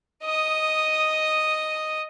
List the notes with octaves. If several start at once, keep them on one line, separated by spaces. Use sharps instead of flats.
D#5 D#6